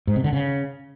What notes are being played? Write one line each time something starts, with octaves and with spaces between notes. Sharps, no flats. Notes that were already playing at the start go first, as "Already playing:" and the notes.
G#2
C3
D3
C#3